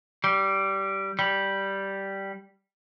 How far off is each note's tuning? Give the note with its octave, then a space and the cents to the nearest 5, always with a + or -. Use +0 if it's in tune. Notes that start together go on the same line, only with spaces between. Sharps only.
G3 -15
G3 -5